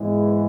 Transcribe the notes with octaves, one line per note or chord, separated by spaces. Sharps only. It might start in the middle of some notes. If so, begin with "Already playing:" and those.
Already playing: G#2 E3 G#3 B3